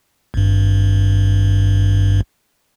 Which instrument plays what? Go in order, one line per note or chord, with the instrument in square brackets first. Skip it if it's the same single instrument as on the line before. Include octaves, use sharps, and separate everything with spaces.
[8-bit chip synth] G#1 G2